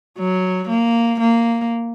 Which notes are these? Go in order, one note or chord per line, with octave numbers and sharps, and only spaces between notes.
F#3
A#3
A#3